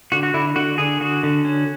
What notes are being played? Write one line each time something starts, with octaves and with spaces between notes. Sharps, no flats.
D3 F#4
F#4
D3 E4
D3 F#4
D3 G#4
D3 F#4
D3
C#4